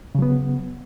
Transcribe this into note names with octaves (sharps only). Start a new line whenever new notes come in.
C#3 F#3 B3